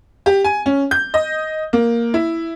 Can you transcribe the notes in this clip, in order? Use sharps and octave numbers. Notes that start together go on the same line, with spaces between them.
G4
G#5
C#4
G6
D#5
A#3
E4